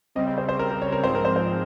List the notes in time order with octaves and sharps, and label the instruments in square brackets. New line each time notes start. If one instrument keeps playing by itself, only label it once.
[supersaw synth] C#3 G3 C4 [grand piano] D#5
[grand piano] D#5
C5
C5
A#4
A#4
C#5
A#4
[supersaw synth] G#2 F3 G#3 C4 [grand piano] C5
[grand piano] A#4
C5
C5